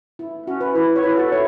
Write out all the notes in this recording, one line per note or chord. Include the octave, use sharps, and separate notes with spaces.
E4
C#4 F#4
B4
E4 B4
C#5
E4 B4
F#4 A4
E4 C#5